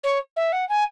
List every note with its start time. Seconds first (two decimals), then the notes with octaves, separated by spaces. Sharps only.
0.03 C#5
0.36 E5
0.52 F#5
0.69 G#5